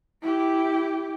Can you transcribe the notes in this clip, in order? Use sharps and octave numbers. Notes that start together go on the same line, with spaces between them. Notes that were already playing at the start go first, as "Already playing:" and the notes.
E4 G4